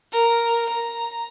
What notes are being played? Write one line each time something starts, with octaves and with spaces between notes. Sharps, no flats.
A#4
A#5